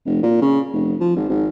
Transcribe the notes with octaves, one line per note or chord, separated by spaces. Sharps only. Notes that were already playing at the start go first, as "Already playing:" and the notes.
F1
A#2
C#3
F1
F3
G#1
G#1